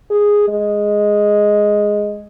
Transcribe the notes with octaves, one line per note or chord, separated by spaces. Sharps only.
G#4
G#3